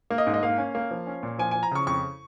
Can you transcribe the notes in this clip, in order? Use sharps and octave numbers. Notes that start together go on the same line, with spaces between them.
A#3
D#5
G#2
D#5
A#3 F5
C#4
A#3
F3
C#4
A#2
F3 G#5
F3 G#5
A#5
C#3 C#6
F2 C#6